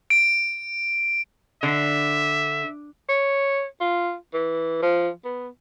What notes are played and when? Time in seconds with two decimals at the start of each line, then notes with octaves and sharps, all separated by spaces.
0.10 D7
1.63 D3 E5
3.09 C#5
3.81 F4
4.34 E3
4.83 F3
5.25 B3